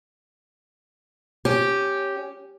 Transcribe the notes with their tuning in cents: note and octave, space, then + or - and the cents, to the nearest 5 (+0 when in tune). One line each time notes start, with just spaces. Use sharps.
C#4 +0 G4 +0